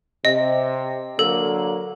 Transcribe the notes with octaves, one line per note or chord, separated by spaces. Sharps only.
C3 D#5
D3 F#3 A#3 A4